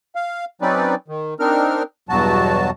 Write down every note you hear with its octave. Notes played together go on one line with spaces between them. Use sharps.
F5
F#3 C4 C#4 D#4 B4 D5
D#3
C4 D4 D#4 A#4 F6
E2 G2 B2 F#3 F#4 A5